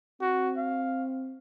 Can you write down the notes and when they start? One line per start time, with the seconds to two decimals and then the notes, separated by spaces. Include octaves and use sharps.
0.21 C4 F#4
0.57 F5